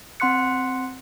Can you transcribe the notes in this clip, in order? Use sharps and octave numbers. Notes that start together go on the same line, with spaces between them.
C4 F#5 C6 F#6 C#7